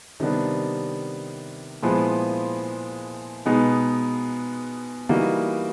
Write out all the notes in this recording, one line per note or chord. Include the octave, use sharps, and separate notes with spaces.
C3 D#3 G3 B3 D4
A#2 F3 G#3 B3 E4
B2 G#3 B3 D#4
E3 G3 A#3 D#4 F#4